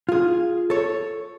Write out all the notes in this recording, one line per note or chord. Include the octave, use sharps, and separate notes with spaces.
F4 G#4
A4 C#5